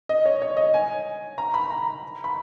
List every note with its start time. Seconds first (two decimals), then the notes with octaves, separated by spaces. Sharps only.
0.09 D#5
0.26 C#5
0.42 C#5
0.57 D#5
0.74 G#5
1.38 A#5
1.54 B5
1.70 A#5
2.24 B5